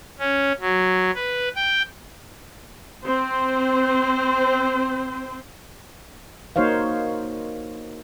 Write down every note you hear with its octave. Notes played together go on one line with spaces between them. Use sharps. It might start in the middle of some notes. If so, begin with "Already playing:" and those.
C#4
F#3
B4
G5
C4 C5
A#3 D#4 F#4 C5 C#5 F5